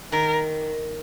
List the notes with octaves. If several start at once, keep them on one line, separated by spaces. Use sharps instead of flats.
D#3 A#4